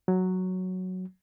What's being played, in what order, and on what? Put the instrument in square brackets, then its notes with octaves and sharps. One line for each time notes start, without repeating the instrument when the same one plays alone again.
[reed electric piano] F#3